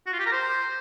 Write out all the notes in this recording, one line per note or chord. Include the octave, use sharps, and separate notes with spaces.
F#4
F4
G4
A#4
C5